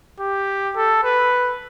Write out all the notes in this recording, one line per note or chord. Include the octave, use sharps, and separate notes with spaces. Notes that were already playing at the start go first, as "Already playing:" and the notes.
G4
A4
B4